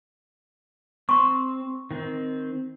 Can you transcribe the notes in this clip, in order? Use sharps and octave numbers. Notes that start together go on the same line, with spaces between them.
C4 C6 C#6
D#3 C4